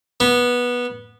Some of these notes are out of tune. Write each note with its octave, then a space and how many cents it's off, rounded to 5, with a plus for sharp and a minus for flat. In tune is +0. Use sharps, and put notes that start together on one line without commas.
B3 -15